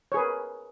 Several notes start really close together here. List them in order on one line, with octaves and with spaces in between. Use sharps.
C#5 G#4 B4 A#4